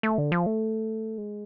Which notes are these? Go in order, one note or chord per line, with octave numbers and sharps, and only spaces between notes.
A3
D3
F3
A3
G#3